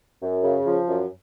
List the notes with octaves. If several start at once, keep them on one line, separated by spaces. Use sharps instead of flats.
F#2
C#3
F3
F#2